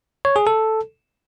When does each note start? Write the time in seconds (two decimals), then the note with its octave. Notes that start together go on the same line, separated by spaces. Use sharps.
0.25 C#5
0.36 G#4
0.47 A4